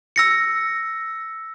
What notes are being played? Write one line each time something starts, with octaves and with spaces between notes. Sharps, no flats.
E6 A#6 C#7